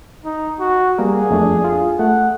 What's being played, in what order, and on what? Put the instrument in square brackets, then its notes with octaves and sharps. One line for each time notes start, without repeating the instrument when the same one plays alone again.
[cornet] D#4
F#4
[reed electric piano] G3 A#3 A#4 [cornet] G#4
[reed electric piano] F2 A3 D4
F4
[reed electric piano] A3 [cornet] F#5